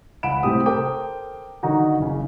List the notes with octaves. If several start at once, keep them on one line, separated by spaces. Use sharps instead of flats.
C#2 F#5 B5 D7 E7
A2 C3 C4 G4 D#6
A4 A#4 C5 G5 D6 D#6
D3 D#3 D#4 F#4
F#1 C#3